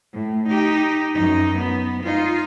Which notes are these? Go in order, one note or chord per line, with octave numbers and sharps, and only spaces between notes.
A2
D#4 G4
F#2 D#4
B3
D#4 F4